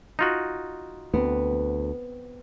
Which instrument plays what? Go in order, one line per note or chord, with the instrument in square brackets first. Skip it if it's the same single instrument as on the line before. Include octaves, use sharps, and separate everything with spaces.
[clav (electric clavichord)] D#4 F4 F#4
[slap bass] D2 [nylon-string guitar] B3 C4